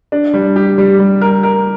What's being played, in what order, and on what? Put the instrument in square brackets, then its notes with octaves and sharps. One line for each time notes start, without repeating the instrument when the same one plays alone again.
[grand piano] D4
G3
G4
G3
G3
A#4
A#4